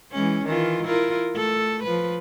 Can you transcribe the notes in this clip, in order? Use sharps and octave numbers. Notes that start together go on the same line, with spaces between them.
E3 G#3 C#4
D#3 E3 F4
E4 F4 A#4
A3 A4
F3 B4